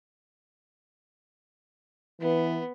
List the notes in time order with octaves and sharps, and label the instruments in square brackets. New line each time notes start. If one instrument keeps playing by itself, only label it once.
[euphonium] E3 [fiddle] B3